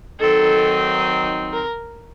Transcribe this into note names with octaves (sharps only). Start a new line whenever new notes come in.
D#3 F#3 C4 D#4 A4
A#4